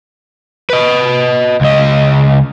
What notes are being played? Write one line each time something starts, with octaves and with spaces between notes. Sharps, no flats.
B4 D#5
C#2 D#5